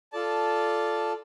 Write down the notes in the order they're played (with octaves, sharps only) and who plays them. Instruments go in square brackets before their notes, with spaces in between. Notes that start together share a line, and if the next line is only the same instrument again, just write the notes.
[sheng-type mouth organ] F4 A4 D5 A5